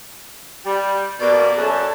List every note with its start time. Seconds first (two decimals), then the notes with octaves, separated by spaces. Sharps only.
0.65 G3
1.20 B2 A#3 D5
1.57 F#2 A4